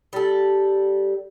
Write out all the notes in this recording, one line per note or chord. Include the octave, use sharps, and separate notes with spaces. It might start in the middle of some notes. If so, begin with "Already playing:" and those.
G3 A4